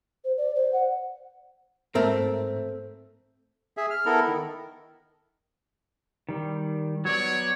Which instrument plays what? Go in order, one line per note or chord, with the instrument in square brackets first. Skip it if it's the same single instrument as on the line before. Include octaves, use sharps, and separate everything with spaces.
[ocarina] C5
D5
C5
F#5
[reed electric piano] G#2 [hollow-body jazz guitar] A3 C4 A#4
[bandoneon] G#4 E5
F6
B3 E4 A4 A#4
D#3
[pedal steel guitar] D#3 G3
[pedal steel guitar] F#3 B3 D5 [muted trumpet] C#5